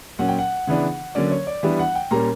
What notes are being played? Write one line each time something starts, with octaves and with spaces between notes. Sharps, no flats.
A#2 F#3 C#4 F#5
G5
F#5
C#3 E3 B3 D4
D3 F#3 A#3 C#4 D5
C#5
D5
E3 G3 B3 D4 E5
F#5
G5
A#2 G3 A#3 C#4 A#5